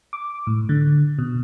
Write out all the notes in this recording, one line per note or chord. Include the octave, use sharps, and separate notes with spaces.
D6
A2
D3
B2